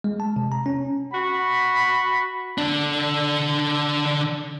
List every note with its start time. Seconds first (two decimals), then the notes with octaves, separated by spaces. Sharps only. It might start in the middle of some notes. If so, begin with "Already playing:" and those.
0.04 G#3
0.20 A5
0.36 C3
0.52 A#5
0.66 C#4
1.13 F#4 B5
2.58 D3 D4